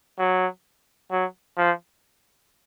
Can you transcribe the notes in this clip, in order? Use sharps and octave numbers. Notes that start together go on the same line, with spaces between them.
F#3
F#3
F3